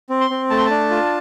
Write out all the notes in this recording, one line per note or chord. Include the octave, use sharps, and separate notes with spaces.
C4
C6
C4
A3 A5
C6
A5
D4
F4